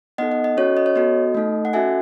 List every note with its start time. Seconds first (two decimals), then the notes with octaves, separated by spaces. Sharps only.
0.18 B3 D#4 A4 D#5 F#5
0.32 D#5
0.44 D#5
0.57 C#4 F#4 A4 C#5
0.77 D#5
0.86 C#5
0.96 B3 F#4 A4 D#5
1.35 A3 D#4 A4
1.65 F#5
1.73 C#4 F#4 A4 E5 G#5